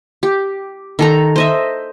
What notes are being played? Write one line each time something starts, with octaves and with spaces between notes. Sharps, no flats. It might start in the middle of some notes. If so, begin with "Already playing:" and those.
G4
D#3 A4 A#5
C5 D#5 E5